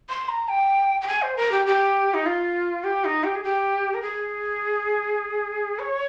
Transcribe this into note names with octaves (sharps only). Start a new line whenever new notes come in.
C6
A#5
G5
G5
G#5
C5
A#4
G4
G4
D#4
F4
G4
D#4
G4
G#4
G4
A#4
G#4
C#5